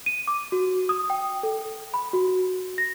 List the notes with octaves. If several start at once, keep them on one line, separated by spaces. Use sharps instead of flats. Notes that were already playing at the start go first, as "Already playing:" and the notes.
D#7
D6
F#4
D#6
G5
A4
B5
F#4
A#6